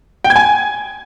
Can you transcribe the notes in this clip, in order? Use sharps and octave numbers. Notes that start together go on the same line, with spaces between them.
G5
G#6
G#5